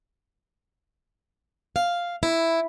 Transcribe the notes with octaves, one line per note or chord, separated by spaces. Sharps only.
F5
E4